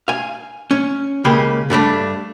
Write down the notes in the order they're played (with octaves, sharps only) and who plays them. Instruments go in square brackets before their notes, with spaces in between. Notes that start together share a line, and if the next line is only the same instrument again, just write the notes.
[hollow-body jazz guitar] F5 G#5
C#4
C#2 C#3 A#3 G4 G#4 B4
G2 G3 A3 D4